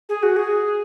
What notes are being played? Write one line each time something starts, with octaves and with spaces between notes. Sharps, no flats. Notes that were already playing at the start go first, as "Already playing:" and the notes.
G#4
F#4
G#4